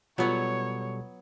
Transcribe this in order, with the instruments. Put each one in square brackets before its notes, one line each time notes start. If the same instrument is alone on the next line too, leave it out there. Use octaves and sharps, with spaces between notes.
[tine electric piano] B2 G3 A4 [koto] F#3 B3 [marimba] F4 [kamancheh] C#5